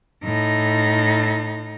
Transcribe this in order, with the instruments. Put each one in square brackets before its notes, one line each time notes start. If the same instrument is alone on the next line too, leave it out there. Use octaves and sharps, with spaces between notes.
[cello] A2 D#4